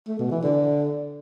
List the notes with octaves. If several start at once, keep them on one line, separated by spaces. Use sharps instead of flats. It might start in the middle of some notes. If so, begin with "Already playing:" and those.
A3
B2
E3
D3